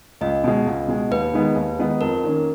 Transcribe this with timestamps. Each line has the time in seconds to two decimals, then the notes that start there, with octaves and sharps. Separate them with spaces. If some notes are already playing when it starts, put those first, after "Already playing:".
0.21 C#2 D#5
0.44 B2 G#3
0.66 C#2
0.88 B2 G#3
1.11 D#2 B4
1.33 D#3 G#3 B3 D#4
1.56 D#2
1.79 D#3 G#3 B3 D#4
2.01 F2 A#4
2.24 D#3 A#3 C#4